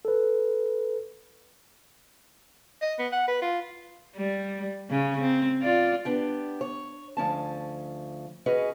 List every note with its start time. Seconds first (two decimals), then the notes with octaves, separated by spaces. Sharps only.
0.05 A4 B4
2.82 D#5
2.99 B3
3.12 F#5
3.28 B4
3.42 F4
4.16 G3
4.90 C#3 C#4
5.21 C4
5.62 F4 D5
6.05 B3 D4 G4
6.61 C#5
7.17 D2 F3 C#4 A5
8.46 C#4 F#4 G#4 B4 D#5